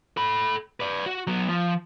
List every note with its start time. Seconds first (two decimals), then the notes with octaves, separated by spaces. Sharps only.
0.17 A4 B5
0.80 B4 D5
1.06 F#4
1.27 F#3 B3
1.49 F3